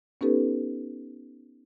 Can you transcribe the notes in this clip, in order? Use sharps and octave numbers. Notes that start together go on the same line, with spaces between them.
B3 C#4 D#4 G4 A4 B4